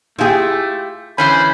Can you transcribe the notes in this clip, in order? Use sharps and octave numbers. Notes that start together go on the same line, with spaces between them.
A3 E4 F4 G4 G#4
D3 E3 C#4 C5 B5